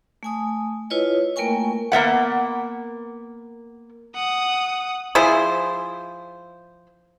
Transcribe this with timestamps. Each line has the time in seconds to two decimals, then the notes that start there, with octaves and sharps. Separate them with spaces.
0.23 A3 G#5 D#6
0.90 E4 F4 B4 C#5 D#5
1.36 A3 A#3 A#4 G5 G#5 C#6
1.92 A#3 B3 E5 F#5
4.15 F#5 D#6
5.15 F3 E4 G#4 C5